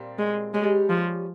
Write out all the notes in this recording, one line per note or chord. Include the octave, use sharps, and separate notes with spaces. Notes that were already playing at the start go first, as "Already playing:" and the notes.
Already playing: A#2 G3 C4
G#3
G3 G#3 C#4 G4
F3